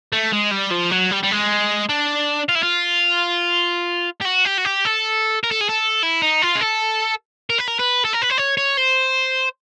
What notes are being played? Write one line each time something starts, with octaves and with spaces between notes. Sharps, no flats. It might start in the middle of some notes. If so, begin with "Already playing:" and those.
A3
G#3
G3
F3
F#3
G3
G3
G#3
D4
F4
E4
F4
G4
F#4
G4
F#4
G4
A4
A#4
A4
G#4
A4
E4
D#4
F4
G#4
A4
A#4
B4
A#4
B4
A4
A#4
B4
C5
C#5
C#5
C5